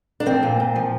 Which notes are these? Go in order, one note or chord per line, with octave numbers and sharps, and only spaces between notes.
D4
F3 C4
A#2
A#2
F3